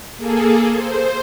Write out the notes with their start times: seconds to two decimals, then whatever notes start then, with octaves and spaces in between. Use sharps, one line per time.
0.17 A#3 G#4 A4
0.74 C5